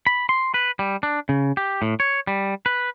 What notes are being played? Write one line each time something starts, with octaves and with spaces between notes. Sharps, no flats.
B5
C6
B4
G3
D4
C#3
G4
A2
C#5
G3
B4